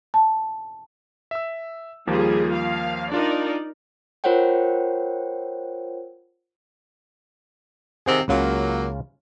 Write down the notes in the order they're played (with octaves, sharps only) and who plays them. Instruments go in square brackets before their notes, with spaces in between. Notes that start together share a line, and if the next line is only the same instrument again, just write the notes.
[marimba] A5
[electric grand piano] E5 E6
[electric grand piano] D#2 F3 A#3 [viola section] G3 F4 G#4
[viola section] F5
[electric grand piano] D4 F4 [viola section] D#4 A#4 D5
[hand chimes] F4 A#4 C5 C#5 F#5 G5
[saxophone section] C3 D#3 C4 [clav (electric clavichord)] G#4 F#5 A#5
[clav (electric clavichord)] C#2 C#3 F4 [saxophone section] F#3 A#3